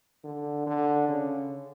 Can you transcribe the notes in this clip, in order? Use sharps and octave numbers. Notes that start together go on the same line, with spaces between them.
D3
D3
C#3